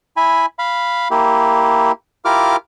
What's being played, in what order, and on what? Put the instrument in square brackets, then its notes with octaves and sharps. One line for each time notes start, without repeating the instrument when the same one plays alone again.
[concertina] E4 G#5 B5
F5 B5
A#3 E4 G4
E4 F4 G4 A#4 D6 F6